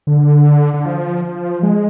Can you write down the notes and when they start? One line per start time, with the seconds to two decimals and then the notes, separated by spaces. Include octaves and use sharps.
0.07 D3
0.74 D3
0.85 F3
1.24 F3
1.63 G#3